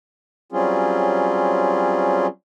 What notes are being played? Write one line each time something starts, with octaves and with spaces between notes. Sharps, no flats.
F#3 G3 C4 C#4 F4 G#4